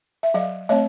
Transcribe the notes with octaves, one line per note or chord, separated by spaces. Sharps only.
E5
F#3 D#5 F5
A3 C4 C#5 D#5